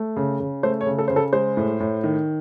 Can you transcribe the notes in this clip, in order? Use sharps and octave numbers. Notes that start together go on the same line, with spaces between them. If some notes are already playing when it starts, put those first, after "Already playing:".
Already playing: A3
C#3
C#3
A3 C5
C#5
C#3
A4
C#3 C5
A4
G#3 C5
A2
A2
D#3